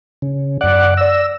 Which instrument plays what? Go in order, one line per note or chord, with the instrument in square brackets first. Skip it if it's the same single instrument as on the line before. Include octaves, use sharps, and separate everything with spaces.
[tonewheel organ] C#3
[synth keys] F#2 F#6 [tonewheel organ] D5 F#5
[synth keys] D5 A#6 [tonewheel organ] E6